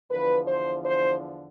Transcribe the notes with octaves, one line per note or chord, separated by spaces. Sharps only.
E2 D3 F3 B4
C5
C5